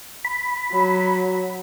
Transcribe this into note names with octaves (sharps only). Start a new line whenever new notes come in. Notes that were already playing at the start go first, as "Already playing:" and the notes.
B5
F#3